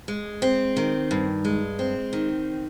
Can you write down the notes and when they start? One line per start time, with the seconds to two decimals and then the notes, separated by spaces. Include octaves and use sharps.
0.08 G#3
0.42 C4
0.77 D#3
1.11 G2
1.45 G#3
1.79 C4
2.13 D#3